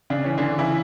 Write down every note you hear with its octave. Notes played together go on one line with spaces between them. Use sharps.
C#3 D4
E3 C#4
D3 E3 D4
C#3 E3 E4